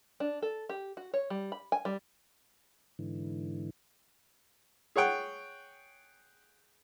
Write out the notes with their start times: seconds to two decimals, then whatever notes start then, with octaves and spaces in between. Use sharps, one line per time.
0.20 D4
0.42 A4
0.69 G4
0.97 F#4
1.14 C#5
1.30 G3
1.52 B5
1.72 G#5
1.85 G3
2.99 G#2 D3 E3
4.96 G#4 C#5 F#5 G5